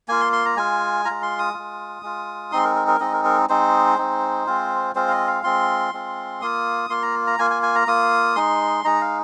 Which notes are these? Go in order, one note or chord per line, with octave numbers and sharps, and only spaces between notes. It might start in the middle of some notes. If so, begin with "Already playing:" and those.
A#3 F4 G#5
C6
C6
A#5
G#3 F4 G#5
F4 A#5
G#3
C6
D#6
G#3 F4
G#3 F4
G#3 C4 D#4 C6
A#4
A#4
A#4
G#3 C4 D#4 D#5
A#4
A#4
G#3 C4 D#4 C5
G#3 C4 D#4
G#3 C4 F4
G#3 C4 F4 C5
F5
D#5
F5
G#3 C4 F4 C6
G#3 C4 F4
A#3 F4 D#6
A#3 F4 C6
A#5
A#5
A#3 F4 G#5
G#5
G#5
A#5
A#3 F4 D#6
G#3 D#4 C6
G#3 D#4 A#5
F5